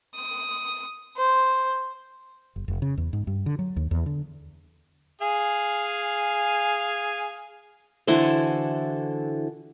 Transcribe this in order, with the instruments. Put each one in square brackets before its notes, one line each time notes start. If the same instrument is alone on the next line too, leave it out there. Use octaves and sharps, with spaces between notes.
[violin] D#6
C5
[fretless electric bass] F#1
F1
C#3
E2
G#2
G2
D3
F#3
D#2
E2
D3
[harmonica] G#4 F5 G#5
[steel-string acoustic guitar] D3 E3 E4 F#4 A4 C5